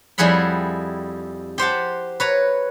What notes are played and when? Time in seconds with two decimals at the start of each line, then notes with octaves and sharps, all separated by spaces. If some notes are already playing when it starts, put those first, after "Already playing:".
0.18 F2 G3 E4 G#4 F#5 B5
1.58 G4 C5 F#5 A5
2.20 B4 C#5 A#5